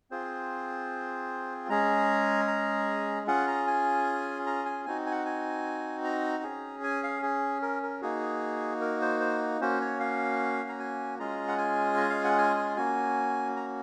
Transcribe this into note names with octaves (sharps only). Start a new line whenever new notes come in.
C4 F4 G#4 C5
G#3 C#4 G#4 A#5
A#5
C#4 F4 G#4 F#5
A#5
G#5
A#5
G#5
C4 D#4 F#4 G#5
G#5
F#5
G#5
A#5
C#4 G#4
G#5
F5
G#4
A#4
A#4
A#3 D#4 F#4 G#4
A#4
C5
C5
A#3 C#4 F#4 C5
C#5
F5
A#5
G#5
G#3 C#4 F4 G#4 A#5
F#5
G#5
D#5
F5
F#5
G#5
G#5
A#3 C#4 F#4 G#5
A#5